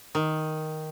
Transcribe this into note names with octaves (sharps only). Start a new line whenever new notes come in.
D#3